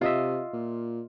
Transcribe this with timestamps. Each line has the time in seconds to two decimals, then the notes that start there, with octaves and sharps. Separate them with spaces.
0.01 C3 F4 D#5 E5
0.53 A#2